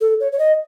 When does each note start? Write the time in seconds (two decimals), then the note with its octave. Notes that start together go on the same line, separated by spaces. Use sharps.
0.01 A4
0.20 C#5
0.32 C#5
0.39 D#5